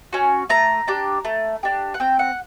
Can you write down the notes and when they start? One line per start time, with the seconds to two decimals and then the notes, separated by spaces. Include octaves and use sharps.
0.13 C#4 F#4
0.49 A3 A#5
0.87 D4 G4
1.25 A3
1.63 D4 G4
1.94 F#5
2.00 C4 G5
2.19 F#5